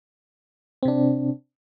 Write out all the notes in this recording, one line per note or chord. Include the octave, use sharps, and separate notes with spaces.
C3 C4 D4